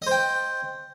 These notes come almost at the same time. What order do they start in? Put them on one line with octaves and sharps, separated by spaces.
D#5 C5 G5